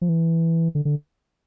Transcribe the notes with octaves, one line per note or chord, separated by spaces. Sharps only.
F3
E3
D3
D3